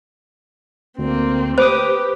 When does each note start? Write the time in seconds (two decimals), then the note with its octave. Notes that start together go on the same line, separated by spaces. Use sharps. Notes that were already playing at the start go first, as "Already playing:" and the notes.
0.99 D2 A#3 C4
1.58 G4 B4 C5 D6 D#6